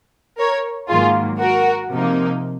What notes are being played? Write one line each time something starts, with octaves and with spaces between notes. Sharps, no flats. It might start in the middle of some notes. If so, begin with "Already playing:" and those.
A#4 C#5
G#2 D#3 F#3 A#3 F4 G#4
F#4 A#4
C3 F3 A#3 D#4